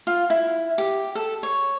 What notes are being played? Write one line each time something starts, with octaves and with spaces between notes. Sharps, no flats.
F4
E4
G4
A4
C#5